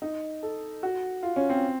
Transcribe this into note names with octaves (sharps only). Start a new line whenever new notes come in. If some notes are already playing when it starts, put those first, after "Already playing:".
D#4
A4
F#4
F4
C#4
C4